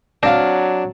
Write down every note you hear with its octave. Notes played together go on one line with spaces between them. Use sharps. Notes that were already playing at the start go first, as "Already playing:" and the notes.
F#3 C4 D4 F5